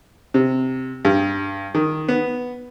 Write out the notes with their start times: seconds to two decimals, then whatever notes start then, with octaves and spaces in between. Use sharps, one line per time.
0.34 C3
1.05 G2
1.75 D#3
2.09 B3